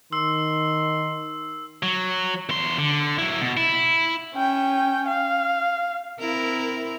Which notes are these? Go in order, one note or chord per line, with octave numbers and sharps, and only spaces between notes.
D#3 C6 E6
F#3
E2 C6
D3
F#3 E4
B2
E4
C#4 G5
F5
C4 E4 A#4